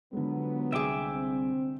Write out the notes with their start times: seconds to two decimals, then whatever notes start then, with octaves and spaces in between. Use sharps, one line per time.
0.13 D3 F3 F#3 G#3 B3
0.72 C2 G#4 E5 G5 D6
1.10 C4